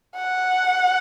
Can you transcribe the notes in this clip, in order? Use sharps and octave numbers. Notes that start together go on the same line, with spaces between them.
F#5